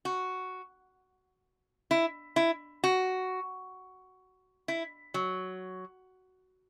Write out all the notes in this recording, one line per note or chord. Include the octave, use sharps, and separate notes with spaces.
F#4
E4
E4
F#4
E4
F#3